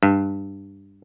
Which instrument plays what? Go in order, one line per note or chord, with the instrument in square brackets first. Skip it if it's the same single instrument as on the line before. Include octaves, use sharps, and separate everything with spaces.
[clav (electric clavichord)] G2